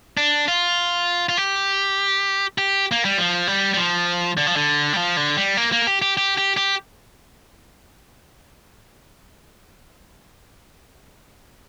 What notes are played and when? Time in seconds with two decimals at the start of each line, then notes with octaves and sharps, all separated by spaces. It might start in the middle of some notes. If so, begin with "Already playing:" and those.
0.17 D4
0.48 F4
1.29 F4
1.38 G4
2.58 G4
2.92 A#3
3.05 G3
3.18 F3
3.47 G3
3.74 G3
3.77 F3
4.37 D3
4.47 F3
4.56 D3
4.93 G3
4.98 F3
5.17 D3
5.37 G3
5.57 A#3
5.72 A#3
5.82 A#4
5.87 G4
6.02 G4
6.17 G4
6.38 G4
6.57 G4